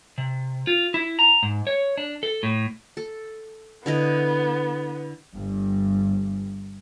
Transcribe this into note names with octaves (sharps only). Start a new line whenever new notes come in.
C3
F4
E4
A#5
G#2
C#5
D4
A4
A2
A4
D3 B3 E4 D#5
G1 G2